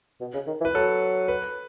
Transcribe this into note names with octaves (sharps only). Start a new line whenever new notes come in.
B2
C#3
D#3
E3
B4
F#3 A4
B4